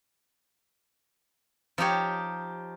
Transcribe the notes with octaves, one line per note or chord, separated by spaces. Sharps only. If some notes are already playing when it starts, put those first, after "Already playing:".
F3 D#4 G4 C#5